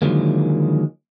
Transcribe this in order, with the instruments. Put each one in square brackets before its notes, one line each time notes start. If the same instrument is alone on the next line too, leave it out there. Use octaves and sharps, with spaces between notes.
[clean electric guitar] D3 D#3 F3 F#3 G#3 A#3